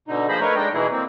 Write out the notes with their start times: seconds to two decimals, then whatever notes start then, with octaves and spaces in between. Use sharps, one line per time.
0.08 B2 D3 D#4
0.29 F3 A#3 G#4 C5 D#5 B5
0.41 A3 D#4 A#4 B4 C#5
0.56 G#3 D4 D#4 D#5 G5
0.74 B2 E3 D#4 E4 G#4
0.92 A#3 C4